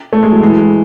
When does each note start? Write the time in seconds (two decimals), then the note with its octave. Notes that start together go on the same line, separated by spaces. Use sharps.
0.13 A3
0.23 G#3
0.32 F#3
0.43 E3 G#3